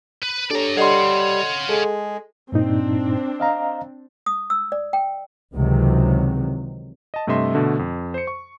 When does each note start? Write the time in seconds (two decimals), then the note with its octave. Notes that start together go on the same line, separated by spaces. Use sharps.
0.22 B4
0.51 D4 G4 A4 C#5 D5 A#5
0.77 G3 A4 C#5 D#5 F5 F#5 C6
1.69 G#3 G#4 A4
2.52 G2 A#2 C4 D4 D#4
3.40 D#5 F5 A#5
4.26 D#6
4.50 E6
4.72 D5
4.93 G5
5.55 C#2 C3 D#3 E3 F#3
7.14 D#5 A5
7.27 G2 C3 A3 D#5 E5 C6
7.54 B2 D3 A3
7.79 F2
8.14 C5 C#7
8.27 C#6